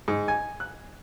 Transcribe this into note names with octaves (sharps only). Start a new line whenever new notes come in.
G#2
G#5
F#6